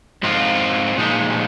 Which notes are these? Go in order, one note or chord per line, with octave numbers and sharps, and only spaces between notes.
G#2 F3 C4 F4
A#2 F3 G#3 D#4